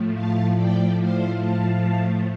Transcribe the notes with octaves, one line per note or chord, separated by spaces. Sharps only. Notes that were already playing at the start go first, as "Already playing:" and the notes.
Already playing: A2 F3 A3
F5 A5
A2 F3 A3 D5 G5
C5 F5
F5 A5